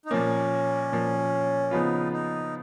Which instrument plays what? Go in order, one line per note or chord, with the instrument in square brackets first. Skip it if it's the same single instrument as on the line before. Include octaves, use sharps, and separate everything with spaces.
[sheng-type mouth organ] D#4
[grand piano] A#2 F3 A#3 [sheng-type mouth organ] C#4
[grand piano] A#2 F3 A#3
[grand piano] C#3 F3 B3 F4 [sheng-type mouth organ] D#4
[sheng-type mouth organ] D#4